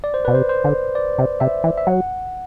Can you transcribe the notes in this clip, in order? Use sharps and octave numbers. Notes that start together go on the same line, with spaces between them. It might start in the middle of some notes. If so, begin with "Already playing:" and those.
D5
C5
B2 B4
C3 C5
C5
D3
D5
C3
C3 E5
E3
E5
F#3 F#5